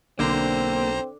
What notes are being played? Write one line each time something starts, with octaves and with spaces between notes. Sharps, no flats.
B1 D3 A#3 C4 C5 A#5